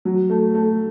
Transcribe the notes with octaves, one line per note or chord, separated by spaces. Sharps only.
F#3
A3
A3